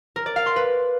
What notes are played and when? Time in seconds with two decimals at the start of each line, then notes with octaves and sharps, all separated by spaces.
0.16 A#4
0.26 D5
0.36 F5
0.46 C6
0.56 B4